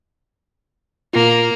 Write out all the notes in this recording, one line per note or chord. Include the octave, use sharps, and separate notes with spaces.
A#2 A#3 F4